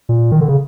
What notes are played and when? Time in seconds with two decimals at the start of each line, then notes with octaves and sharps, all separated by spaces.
0.09 A#2
0.32 D#3
0.41 D3
0.48 C#3